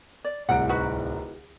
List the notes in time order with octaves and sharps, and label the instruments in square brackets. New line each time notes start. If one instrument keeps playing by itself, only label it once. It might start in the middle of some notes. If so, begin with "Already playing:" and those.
[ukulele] D5
[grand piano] D1 C2 D7 [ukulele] F#5
[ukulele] D#4 F#4 B4